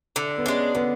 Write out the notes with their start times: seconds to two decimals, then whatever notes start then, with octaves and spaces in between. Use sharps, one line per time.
0.16 D3
0.38 B3
0.45 G#3 C#4 D4
0.75 D3 B3